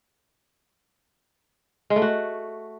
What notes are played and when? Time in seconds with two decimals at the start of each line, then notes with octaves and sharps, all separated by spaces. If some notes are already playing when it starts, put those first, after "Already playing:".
1.90 G#3
1.96 A3
2.02 F#4